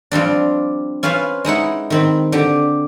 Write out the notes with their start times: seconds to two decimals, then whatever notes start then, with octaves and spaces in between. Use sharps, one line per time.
0.12 F3 G3 C4 D4
1.03 C#4 F4 B4 C5 F5
1.45 G#3 D#4 E4 F#5
1.90 D#3 C4 B5
2.32 D3 G4